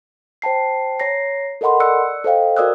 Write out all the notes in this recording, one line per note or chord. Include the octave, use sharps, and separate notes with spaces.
C5 G5 A5 C7
C#5 A#5 A#6 C7
A4 A#4 D#5 F#5 B5 C6
D5 C#6 E6 F#6 C#7
A4 C5 D#5 F5 G5
F#4 A#4 D5 D#6 E6 F#6